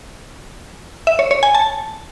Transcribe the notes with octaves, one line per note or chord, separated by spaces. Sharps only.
E5
C#5
C#5
G#5
A5